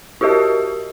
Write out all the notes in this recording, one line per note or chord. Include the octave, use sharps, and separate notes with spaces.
E4 F#4 G4 A#4 D#5